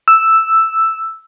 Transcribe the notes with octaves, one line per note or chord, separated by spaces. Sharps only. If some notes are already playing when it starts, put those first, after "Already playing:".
E6